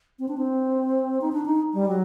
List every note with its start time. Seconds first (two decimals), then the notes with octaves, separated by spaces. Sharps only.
0.19 C4
0.28 D4
0.38 C4
1.21 D#4
1.32 D4
1.46 D#4
1.74 G3
1.88 F#3